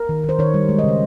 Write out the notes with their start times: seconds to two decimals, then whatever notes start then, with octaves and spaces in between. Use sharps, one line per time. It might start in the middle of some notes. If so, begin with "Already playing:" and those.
Already playing: A#4
0.09 D#3
0.24 D#3 C5
0.39 D#3 C#5
0.54 G3
0.69 G#3
0.79 D#5
0.84 C#3 C5